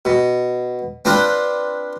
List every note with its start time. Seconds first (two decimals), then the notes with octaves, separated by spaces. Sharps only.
0.05 B2
1.05 C4 D4 F4 B4 C5